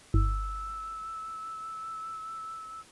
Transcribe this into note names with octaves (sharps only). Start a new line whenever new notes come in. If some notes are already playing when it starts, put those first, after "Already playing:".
G1 E6